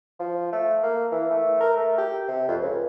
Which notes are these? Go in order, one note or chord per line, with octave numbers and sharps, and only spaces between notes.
F3
A3
A#3
E3
A3
A#4
A3
G4
C3
F2
C#2